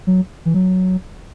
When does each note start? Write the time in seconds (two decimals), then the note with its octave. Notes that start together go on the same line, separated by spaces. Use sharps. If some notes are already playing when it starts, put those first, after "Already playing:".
0.07 F#3
0.46 E3
0.54 F#3